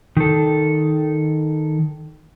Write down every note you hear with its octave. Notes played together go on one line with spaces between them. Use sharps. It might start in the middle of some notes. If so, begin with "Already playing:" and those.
D#3 A4